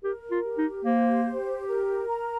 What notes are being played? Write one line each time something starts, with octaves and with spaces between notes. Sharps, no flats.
G4 A#4
F4
G4
D#4
A#3 C5
G4
A#4
A#5